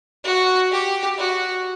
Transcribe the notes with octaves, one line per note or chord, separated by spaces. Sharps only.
F#4
G4
F#4